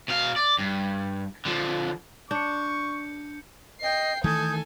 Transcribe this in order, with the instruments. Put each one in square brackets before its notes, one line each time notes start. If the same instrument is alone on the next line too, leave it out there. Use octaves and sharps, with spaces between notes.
[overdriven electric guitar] B2 F5
D5
G2
D3 F3
[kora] D4 [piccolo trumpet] C#6 [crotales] G6 C#7
[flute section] D#5 [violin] G5 C7
[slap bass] D#3 E3 A3 [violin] A4 G#5 [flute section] D#6 G6 G#6